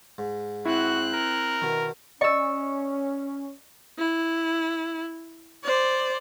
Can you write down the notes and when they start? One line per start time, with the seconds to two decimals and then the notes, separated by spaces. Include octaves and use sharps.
0.18 G#2
0.65 C4 E4 F#4 F#6
1.13 A#4
1.62 B2 D#3
2.21 C#4 D5 D#5 C#6 E6
3.98 E4
5.64 C5 D5